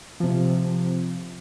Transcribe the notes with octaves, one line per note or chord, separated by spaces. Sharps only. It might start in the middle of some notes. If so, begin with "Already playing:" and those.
C3 F3